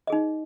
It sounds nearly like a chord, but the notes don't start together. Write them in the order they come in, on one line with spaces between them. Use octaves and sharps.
D#5 G#4 D#4